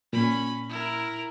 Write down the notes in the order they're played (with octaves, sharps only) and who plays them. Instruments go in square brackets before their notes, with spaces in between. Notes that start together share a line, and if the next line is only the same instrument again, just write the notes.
[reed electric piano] A#2 [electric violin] C#4 B5
[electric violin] E4 A#4